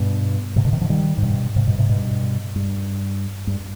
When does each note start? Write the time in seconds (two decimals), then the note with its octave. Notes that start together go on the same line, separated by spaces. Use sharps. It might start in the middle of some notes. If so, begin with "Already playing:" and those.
Already playing: G2 B2
0.56 G#2 C3
0.64 B2 D3
0.73 C3 D#3
0.81 D3 F3
0.89 D#3 G3
1.17 G#2
1.23 G2 B2
1.56 G#2 C3
1.67 G2 B2
1.78 G#2 C3
1.89 G2 B2
2.56 G2
3.47 G2